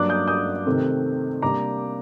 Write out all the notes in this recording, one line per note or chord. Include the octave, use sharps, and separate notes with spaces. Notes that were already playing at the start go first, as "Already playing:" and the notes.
Already playing: G2 F#3 A#3 D4 D6 F#6
D#6 G6
D#6 G6
C3 D#3 A3 C4
C3 G3 A#3 D4 A#5 D6